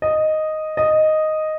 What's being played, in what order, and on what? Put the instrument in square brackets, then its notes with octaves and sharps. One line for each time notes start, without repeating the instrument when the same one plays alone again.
[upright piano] D#5
D#5